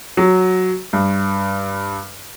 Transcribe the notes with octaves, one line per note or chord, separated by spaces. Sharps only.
F#3
G2